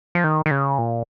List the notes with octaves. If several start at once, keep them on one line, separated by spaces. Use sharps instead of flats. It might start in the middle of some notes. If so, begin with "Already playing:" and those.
F3
D#3
D#3
C#3
A#2